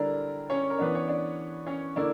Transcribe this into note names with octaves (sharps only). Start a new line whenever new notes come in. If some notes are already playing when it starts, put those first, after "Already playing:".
Already playing: D3 G3 D4 E4 A#4 D5 A#5
C#4 C#5
A#4
E3 B3 D4 B4
C#5
D4 D5
C#4 C#5
D3 A#3 D4 E4 D5